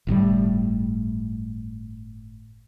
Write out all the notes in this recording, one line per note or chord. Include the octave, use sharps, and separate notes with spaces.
G1 A2 C3 G3